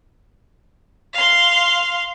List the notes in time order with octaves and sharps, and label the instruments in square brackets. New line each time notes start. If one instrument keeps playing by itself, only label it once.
[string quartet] F5 C6